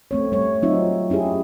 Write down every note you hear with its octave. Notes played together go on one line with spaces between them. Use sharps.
A3 C4 C#5
G3 C#5
F#3 C4 D#4 F4 E5
C#4 E4 G4 G#4